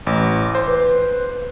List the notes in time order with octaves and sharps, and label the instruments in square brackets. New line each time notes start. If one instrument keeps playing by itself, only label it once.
[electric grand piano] A1 [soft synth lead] D6
[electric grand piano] C5
[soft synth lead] B4